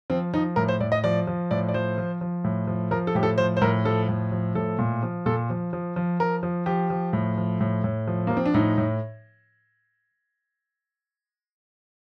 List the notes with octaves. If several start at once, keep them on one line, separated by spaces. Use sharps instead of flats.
F3 C4
F3 D#4
A2 A#4
C5
A2 D5
D#5
F3 D5
F3
A2 D5
D5
F3 C5
F3
F3
A2
F3
F3 A#4
A4
A2 G4
A4
F3 C5
C5
A2 A#4
F3 A4
A2
F3
A2 A4
A#2
F3
A#2 A4
F3
F3
F3
F3 A#4
F3
F3 G4
F3
A2
F3
A2
A2
F3
F3 A#3
C4
D4
A2 D#4
A2